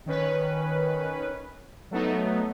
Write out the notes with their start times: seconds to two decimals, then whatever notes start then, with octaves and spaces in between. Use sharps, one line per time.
0.06 D#3 C#4 B4
1.91 F#3 A3 B3 D#4